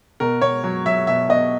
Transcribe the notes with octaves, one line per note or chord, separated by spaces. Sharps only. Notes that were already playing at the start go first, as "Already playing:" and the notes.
B2 A#4
B2 C#5
F#3
F#3 E5
B2 E5
B2 D#5